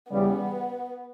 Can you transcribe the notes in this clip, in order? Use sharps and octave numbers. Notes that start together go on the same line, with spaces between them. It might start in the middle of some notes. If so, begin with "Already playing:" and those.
E2 C#3 G3 B3